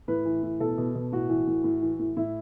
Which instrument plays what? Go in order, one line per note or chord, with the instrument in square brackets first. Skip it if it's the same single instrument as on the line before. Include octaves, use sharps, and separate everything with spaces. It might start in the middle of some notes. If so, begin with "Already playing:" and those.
[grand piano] A2 B4
E3
A2
B2 A4
B2
B2
A2 F#4
E3
A2
A2
E3
A2
A2 E4